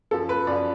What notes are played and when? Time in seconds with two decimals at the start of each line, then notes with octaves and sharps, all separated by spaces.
0.11 F#2 F3 A4
0.29 B4
0.47 F#2 F3 D5